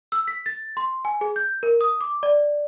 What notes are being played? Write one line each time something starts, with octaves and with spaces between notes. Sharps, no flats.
E6
B6
A6
C6
G#5
G#4
G6
A#4
D#6
D6
D5